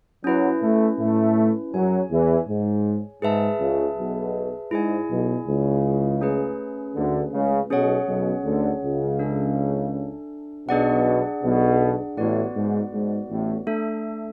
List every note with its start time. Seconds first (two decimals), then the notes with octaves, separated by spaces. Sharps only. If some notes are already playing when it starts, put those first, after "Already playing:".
0.24 F#2 F#3 C#4 E4 B4
0.61 A2 A3
0.98 A2 A3
1.73 F#2 F#3 G#4 C#5 G#5
2.11 E2 E3
2.48 G#2
3.22 G#2 G#4 B4 E5 A5
3.60 C#2 C#3
3.97 B1 B2
4.71 G#2 E4 G#4 D5 G#5
5.09 B1 B2
5.46 C#2 C#3
6.21 A3 C#4 G#4 B4
6.95 D2 D3
7.33 C#2 C#3
7.70 B1 B2 C#4 G#4 C#5 F#5
8.07 B1 B2
8.44 D2 D3
8.82 C#2 C#3
9.19 D4 A4 E5 G#5
10.68 B1 B2 D4 G#4 D5 F#5
11.43 B1 B2
12.17 A1 A2 B3 F#4 B4 D5 F#5
12.55 G#2
12.93 G#2
13.29 A1 A2
13.67 A3 D4 A4 E5